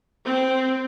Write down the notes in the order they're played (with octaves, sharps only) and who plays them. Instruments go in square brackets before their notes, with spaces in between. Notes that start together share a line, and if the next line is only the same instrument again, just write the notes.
[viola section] C4